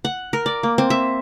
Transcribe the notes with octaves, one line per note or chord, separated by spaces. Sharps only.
F#5
A#4
D5
A#3
C4
E5